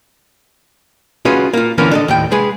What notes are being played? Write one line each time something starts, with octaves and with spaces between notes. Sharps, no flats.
C#4 F4 F#4 G#4 B4
A#3 F4
D3 E3 F3 A#3 B3 C#4
D4 A4 D#5
D#2 A2 G5
G#3 G#4 B4